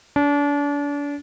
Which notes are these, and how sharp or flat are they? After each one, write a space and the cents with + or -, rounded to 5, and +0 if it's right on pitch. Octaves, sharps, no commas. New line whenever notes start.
D4 -35